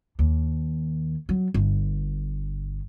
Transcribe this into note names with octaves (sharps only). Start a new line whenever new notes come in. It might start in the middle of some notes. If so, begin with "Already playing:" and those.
D#2
F#3
G1